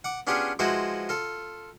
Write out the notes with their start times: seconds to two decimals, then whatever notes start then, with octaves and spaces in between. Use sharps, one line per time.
0.04 F#5 D6
0.27 B3 C#4 D4 F4 G4 G#4
0.59 F3 G#3 E4 F#4 B4 C5
1.09 F4 A4